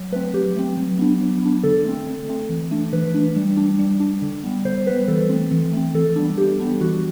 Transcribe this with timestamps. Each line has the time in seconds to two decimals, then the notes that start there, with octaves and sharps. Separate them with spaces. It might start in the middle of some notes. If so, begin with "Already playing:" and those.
Already playing: F#3
0.12 A3 B4
0.16 C4
0.34 F#3 G4
0.56 A3 C4
0.77 F#3
0.99 B3 D4
1.21 F#3
1.42 B3 D4
1.63 D3 A4
1.85 A3 C4
2.07 D3
2.28 A3 C4
2.49 E3
2.71 A3 D4
2.93 E3 B4
3.14 A3 D4
3.36 G3
3.57 D4
3.79 G3
4.00 D4
4.22 D3
4.44 G3 B3
4.65 D3 C5
4.87 G3 B3 B4
5.08 E3 A4
5.29 A3 C4
5.52 E3
5.73 A3 C4
5.94 E3 A4
6.16 G3 B3 D4
6.37 E3 G4
6.59 G3 B3 D4
6.81 E3 F#4